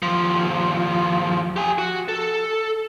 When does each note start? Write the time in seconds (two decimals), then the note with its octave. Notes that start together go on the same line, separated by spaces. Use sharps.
0.02 D#2 F3
1.56 G4 G#5
1.78 F#4
2.08 A4